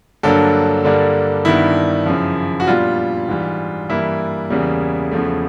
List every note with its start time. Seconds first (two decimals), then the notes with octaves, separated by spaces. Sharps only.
0.23 G2 D3 F#3 A#3 D4 A4
0.84 G2 D3 G3 A#3 D4
1.45 G2 D#3 G3 B3 D4 E4
2.06 F#2 C#3 F3
2.60 F#4
2.67 A#2 G3 B3 D4 F4
3.28 G#2 E3 G3
3.89 G2 E3 G3 A#3 E4
4.50 E2 C#3 E3 G3 A#3
5.12 E2 C#3 F3 A3